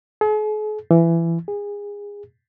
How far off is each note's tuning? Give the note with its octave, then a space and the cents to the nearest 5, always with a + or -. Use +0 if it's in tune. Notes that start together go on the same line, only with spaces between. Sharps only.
G#4 +45
E3 +20
G#4 -25